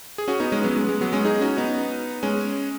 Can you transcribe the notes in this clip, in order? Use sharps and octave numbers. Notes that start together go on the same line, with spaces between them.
G#4
C#4 F#4
B3 D#4
G#3 C#4
F#3 B3
G#3
G#3
F#3 B3
G#3 C#4
D#4 G#4
C#4 F#4
B3 D#4
G#3 C#4